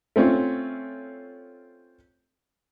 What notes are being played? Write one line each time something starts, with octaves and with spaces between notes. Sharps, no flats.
A3 C4 C#4 F4